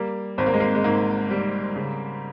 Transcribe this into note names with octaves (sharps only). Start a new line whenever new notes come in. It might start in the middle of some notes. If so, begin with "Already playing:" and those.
Already playing: G3 A#3
G#1 C4
A#3
G#3
A#3
G#3
G#2 A#3
G3
C#3